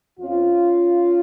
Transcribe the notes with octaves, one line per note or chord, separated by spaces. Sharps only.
F2 F3 C#4 F4